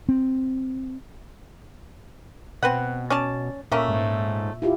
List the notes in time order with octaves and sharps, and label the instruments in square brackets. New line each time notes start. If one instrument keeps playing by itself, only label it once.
[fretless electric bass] C4
[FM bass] B2 [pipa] C4 B4 F#5
[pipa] C#4 D5 A5
[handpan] A#2 E5 [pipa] A3 A#3 C#4
[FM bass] G#2
[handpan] E4 F4 G4